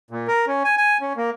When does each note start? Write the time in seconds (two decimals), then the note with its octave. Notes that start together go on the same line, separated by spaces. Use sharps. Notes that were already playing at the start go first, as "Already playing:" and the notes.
0.11 A#2
0.28 A#4
0.47 C#4
0.64 G#5
0.77 G#5
1.01 C#4
1.17 A#3